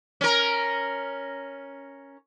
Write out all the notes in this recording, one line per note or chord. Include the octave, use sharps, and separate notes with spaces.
C#4 A#4